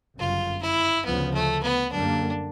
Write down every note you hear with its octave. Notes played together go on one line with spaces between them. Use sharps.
G1 F#2 C#3 F4
E4
D2 C#3 F3 B3
A3
B3
F#2 D3 G3 A#3 D4